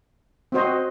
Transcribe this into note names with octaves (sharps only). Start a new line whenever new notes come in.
C4 F#4 C5 D#5